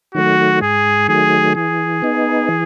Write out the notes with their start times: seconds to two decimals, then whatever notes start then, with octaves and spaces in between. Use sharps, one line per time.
0.15 D#3 F#3 A3 F#4
0.62 G#2 G#4
1.08 D#3 F#3 A3 G#4
1.55 E3 G#4
2.02 B3 D#4
2.49 E3